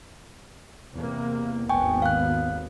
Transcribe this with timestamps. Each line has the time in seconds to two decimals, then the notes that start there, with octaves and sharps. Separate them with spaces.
0.94 E2 C3 A#3
1.69 G#1 D#2 B3 G5 G#5 C#6
2.02 F5 F#6